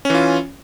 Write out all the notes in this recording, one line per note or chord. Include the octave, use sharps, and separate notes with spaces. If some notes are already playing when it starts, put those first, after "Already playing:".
E3 C#4 F4